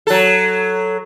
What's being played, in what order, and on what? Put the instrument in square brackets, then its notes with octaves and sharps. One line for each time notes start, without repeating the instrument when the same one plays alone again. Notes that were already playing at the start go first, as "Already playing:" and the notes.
[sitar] F#3 A4